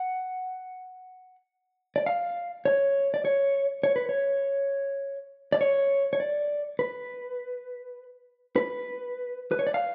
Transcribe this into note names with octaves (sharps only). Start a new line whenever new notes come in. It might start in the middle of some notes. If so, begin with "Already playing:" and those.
Already playing: F#5
D5
F5
C#5
D5
C#5
C#5
B4
C#5
D5
C#5
C#5
D5
B4
B4
B4
C#5
D5
F5